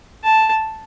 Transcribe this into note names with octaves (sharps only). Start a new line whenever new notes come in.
A5